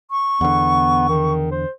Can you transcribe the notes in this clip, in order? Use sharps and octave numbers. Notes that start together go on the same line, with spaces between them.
C#6
E2 D3 B3
D#3
C5